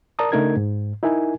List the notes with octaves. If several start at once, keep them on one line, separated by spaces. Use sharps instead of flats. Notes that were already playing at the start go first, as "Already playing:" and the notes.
A#4 D5 A5 A#5 D#6
C#3 A3 D4 D#4 A#4 G#6
G#2
D#4 E4 A#4 G#5